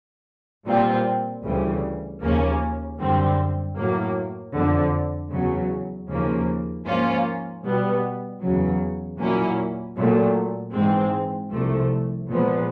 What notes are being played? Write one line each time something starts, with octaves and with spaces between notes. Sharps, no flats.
A#2 G3 C4 F4
D2 C#3 E3 G3
D#2 C#3 F3 A#3 C#4
F#2 D3 G3 C4
A2 F#3 A#3
F2 D3 F3
E2 C#3 F#3
D#2 C#3 F3 A#3
G#2 F3 A#3 C#4 F4
B2 G3 B3
E2 C#3 F#3
A#2 F#3 A#3 C#4 E4
A#2 F#3 A3
G#2 E3 G#3 C4
C2 C3 F3 A3
A#2 F3 G#3 B3